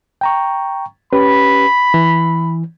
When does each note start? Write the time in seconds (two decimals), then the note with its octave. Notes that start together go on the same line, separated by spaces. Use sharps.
0.21 G5 A#5 C#6
1.13 C#4 G4 B4 B5
1.94 E3